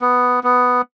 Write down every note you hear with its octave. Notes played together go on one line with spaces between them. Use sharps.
B3
B3